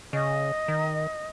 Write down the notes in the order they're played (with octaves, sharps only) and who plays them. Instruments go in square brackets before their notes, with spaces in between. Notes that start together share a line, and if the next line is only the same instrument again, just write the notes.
[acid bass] C#3 [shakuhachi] D#5
[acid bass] D#3